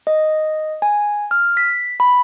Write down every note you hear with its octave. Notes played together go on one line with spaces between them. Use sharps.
D#5
G#5
F6
B6
B5